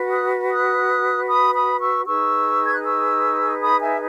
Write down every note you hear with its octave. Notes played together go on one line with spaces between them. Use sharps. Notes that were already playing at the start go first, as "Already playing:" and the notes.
Already playing: F#4 B4
D#6 F#6
D#6 F#6
B5 D#6
B5 D#6
C#6 E6
D#4 G#4 B4 C#6 E6
G#6
F#6
C#6 E6
B5 D#6
E5 G#5